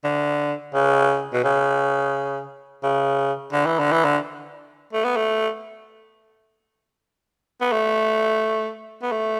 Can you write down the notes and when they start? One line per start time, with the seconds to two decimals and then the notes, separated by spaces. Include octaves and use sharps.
0.04 D3
0.74 C#3
1.33 B2
1.44 C#3
2.83 C#3
3.53 D3
3.66 E3
3.80 D3
3.93 E3
4.05 D3
4.93 A3
5.05 B3
5.17 A3
7.61 B3
7.72 A3
9.02 B3
9.12 A3